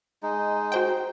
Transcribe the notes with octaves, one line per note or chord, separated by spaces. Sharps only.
G#3 D#4
F#4 C5 G5